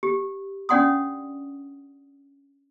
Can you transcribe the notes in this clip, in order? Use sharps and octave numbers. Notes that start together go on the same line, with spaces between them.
G4
C#4 D4 D5 F#5 C6 D#6